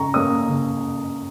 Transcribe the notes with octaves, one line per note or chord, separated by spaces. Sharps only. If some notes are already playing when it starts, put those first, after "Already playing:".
Already playing: C#3 A#5 C#6
A#3 C#4 D#6
C#3